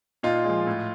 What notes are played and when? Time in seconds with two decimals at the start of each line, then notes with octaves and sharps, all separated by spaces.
0.23 A#2 D#4 F4
0.44 G#3
0.49 F3
0.67 A2